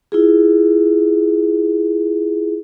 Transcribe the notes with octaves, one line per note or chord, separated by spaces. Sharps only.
E4 F4 G#4